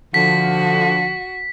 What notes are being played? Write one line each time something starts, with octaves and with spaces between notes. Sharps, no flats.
D3 F3 F#4 B6